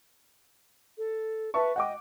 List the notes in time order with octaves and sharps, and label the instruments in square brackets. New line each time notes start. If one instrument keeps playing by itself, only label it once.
[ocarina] A4
[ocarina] B4 [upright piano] E5 A5 C#6
[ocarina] D#5 [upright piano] F#5 G5 D6